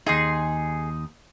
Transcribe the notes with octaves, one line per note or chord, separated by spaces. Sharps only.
D#2 D#4 G#4 C6